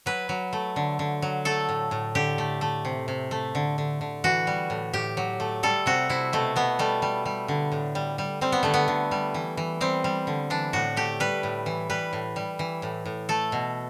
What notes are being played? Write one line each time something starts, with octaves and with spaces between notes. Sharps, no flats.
F#3 B4
F#3
A3
D3
D3
F#3
A3 A4
A2
A2
D3 G4
A3
A3
C3
C3
A3
D3
D3
D3
E3 F#4
G3
A2
A2 G4
F#3
A3
G3 A4
C3 F#4
C3 E4
B2 A3
B2 B3
G3 A3
G3
G3
D3
A2
G3
G3
G3 C4
B3
D3 A3
B3
D3
G3
E3
E3
G3 C4
G3
D3
E3 D4
A2 F#4
A3 G4
G3 B4
A2
E3
G3 B4
A2
G3
E3
A2
A2
A3 A4
B2